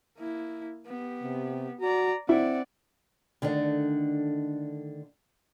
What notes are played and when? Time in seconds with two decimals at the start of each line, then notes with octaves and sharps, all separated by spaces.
0.18 A#3 E4
0.86 B3 G4
1.23 C3
1.81 F#4 D5 A#5
2.29 C4 E4 D5 F#5
3.42 D3 D#3 A3 D4